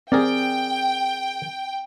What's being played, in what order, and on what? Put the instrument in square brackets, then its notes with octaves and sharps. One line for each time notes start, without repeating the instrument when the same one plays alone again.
[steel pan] C4 [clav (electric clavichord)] G#4 A#4 D5 [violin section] G5